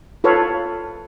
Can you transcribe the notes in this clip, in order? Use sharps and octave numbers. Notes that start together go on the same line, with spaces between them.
F4 A4 B4 C#5 F5